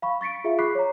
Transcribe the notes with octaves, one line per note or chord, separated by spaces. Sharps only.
F5 B5 C#6
C#6 A6 B6 C#7 D7
F4 G#4 E5 F5
B5 C#6 D6 F#6 B6 C7
C#5 A#5